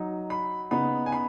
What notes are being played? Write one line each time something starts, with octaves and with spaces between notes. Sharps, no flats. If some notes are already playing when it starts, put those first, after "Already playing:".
Already playing: F#3 D#4
B5
C#3 B3 D#4 B5
G#5
B5